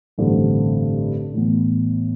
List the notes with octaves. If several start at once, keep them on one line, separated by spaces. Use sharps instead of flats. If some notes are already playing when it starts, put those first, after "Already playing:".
A1 G2 D3 A3 C4
A2 E3 B3